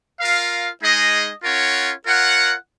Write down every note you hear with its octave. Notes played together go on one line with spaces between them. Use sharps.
F4 A#4 F5
G#3 D#4 G#4 D#5
C#4 F4 A#4 C#5 F#5
F4 A#4 C#5 F#5